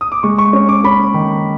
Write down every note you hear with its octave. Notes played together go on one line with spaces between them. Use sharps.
D#6
D6
G#3 C#6
C#6
C#4
D6
C#4 B5
D#3